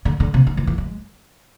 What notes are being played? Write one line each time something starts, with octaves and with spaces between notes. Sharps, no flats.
D3
D3
C3
D3
E3
E3
G#3